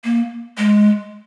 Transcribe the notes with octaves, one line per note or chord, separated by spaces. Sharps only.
A#3
G#3